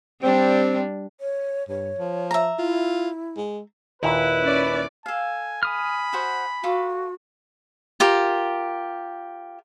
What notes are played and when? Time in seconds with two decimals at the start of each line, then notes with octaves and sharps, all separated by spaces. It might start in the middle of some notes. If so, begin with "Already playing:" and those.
0.22 G3 C4 D4
1.21 C#5
1.68 G2 C#5
1.99 F3
2.31 E5 A#5
2.59 E4 F4
3.37 G#3
4.03 D#2 A#2 E4 B4
4.41 C#4 D5
5.06 A4 F5 G#5
5.63 G#5 B5 D#6 F6
6.13 F#4 C5 F#5
6.64 F4 F#4 A4 D6
8.00 F4 G4 A#4